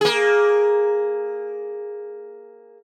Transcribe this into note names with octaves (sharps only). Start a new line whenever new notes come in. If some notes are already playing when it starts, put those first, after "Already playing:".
A#3 G#4